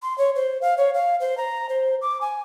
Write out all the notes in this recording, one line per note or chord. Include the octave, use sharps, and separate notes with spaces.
C6
C#5
C5
F5
C#5
F5
C5
A#5
C5
D6
G#5